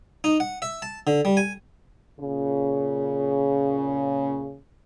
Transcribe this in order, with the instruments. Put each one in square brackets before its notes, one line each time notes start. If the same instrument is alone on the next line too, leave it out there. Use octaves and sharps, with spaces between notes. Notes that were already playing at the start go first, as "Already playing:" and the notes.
[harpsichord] D#4
F#5
E5
A5
D3
G3
G#5
[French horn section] A#2 C#3